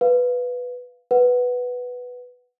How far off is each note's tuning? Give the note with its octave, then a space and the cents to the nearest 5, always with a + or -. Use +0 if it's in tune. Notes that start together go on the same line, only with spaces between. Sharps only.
B4 +0 F5 +0
B4 +0 F#5 +0